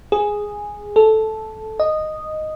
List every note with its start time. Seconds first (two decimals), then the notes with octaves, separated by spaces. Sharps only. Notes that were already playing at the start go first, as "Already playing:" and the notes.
0.12 G#4
0.96 A4
1.80 D#5